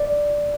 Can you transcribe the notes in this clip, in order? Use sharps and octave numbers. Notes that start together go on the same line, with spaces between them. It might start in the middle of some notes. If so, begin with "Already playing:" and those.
Already playing: D5